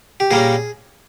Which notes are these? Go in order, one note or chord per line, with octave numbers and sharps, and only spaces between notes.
G4
A#2 G3 A#3 C#4 G#4